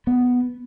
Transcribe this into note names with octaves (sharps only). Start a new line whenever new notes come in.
B3